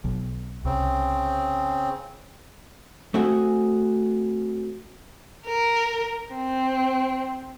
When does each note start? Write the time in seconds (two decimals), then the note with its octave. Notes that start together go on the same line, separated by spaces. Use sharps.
0.04 B1
0.65 C2 C#3 C4
3.14 A3 C4 F#4 G#4
5.46 A#4
6.35 C4